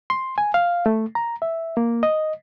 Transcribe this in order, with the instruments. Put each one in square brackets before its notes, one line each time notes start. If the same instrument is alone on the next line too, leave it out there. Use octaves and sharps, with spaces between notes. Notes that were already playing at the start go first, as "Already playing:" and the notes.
[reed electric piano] C6
G#5
F5
A3
A#5
E5
A#3
D#5